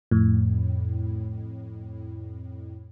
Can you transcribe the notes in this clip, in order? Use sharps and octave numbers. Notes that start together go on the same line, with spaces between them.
F2 A2